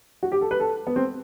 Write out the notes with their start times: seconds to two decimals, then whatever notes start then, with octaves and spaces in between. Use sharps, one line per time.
0.23 F#4
0.32 G4
0.41 A4
0.51 B4
0.60 A4
0.87 B3
0.96 C4